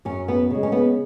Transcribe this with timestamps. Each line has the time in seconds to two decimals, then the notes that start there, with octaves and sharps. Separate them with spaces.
0.05 F#2 C#4
0.28 B3
0.50 C#3 G#3
0.63 C#4
0.72 B3